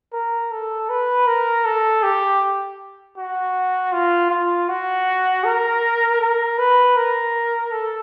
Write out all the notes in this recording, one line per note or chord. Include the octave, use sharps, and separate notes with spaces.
A#4
A4
B4
A#4
A4
G4
F#4
F4
F4
F#4
A#4
A#4
B4
A#4
A4